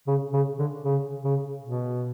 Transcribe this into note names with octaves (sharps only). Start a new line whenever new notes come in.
C#3
C#3
D3
C#3
C#3
B2